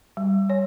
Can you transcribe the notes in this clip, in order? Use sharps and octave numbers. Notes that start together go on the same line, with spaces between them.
G3
C#5